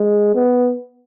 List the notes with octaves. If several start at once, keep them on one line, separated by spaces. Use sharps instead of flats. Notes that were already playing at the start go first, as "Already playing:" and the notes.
Already playing: G#3
B3